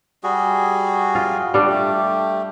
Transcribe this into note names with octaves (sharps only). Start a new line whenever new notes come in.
G3 F#4 G#4
F4
G3 D4
A3 G4